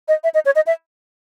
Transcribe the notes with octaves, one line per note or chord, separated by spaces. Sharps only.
D#5
E5
D#5
C#5
D#5
E5